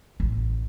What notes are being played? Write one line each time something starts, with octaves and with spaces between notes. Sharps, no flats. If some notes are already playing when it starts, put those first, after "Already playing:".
A1